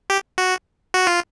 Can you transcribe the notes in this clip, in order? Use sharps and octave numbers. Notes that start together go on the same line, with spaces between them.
G4
F#4
F#4
F4